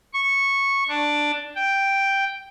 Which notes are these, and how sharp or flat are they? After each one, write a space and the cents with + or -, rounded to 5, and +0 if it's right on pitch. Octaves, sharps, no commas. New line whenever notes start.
C#6 -10
D4 +5
G5 +0